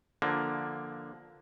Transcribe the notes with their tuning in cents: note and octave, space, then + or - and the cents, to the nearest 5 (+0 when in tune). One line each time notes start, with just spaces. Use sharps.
D3 +5 F3 +0 A#3 +10